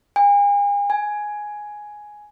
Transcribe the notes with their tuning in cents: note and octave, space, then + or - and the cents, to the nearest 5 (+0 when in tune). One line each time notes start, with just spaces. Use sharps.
G#5 -40
G#5 +5